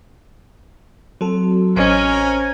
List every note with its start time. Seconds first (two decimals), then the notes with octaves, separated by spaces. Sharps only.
1.21 F#3 C4 F#4 A4
1.77 A1 C#4 A#4 C5 D#5 G#5 C#7